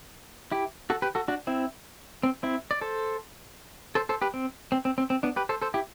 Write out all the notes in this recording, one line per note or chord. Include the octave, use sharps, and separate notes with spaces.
E4 G4
F#4 A4
G4 B4
F#4 A4
D4 F#4
C4 E4
C4
C4 E4
D5
A4 C5
A4 C5
A4 C5
G4 B4
C4
C4
C4
C4
C4
B3 D4
G4 B4
A4 C5
A4 C5
E4 G4